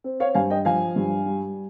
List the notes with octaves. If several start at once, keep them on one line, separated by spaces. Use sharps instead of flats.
C4
C#5 F5
G2 F5 G#5
D#5 G5
F3 F5 G#5
G2
G3